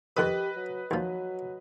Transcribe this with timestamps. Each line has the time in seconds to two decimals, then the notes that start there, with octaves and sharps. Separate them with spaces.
0.17 F2 D#3 G4 B4 D#5 D#6 F#6
0.56 F#3
0.91 D#2 F3 F#3